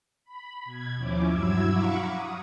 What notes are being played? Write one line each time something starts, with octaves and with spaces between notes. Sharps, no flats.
B5
B2 G#6
D#2 F3 C#4 E4 D6
G2 F#3 E4 E6 G#6
F5 F#5 A#5 B5 C#6 D6
D#6